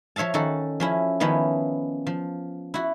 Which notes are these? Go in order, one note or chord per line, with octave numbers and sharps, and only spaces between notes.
F3 C#5 E5 F5 A5
D#3 C#4 F#4 A4
F3 C#4 E4
D#3 F3 B3 C#4 E4
F3
E4 F#4